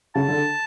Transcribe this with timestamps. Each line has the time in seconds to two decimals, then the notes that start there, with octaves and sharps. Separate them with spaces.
0.15 C#3 A5
0.28 D3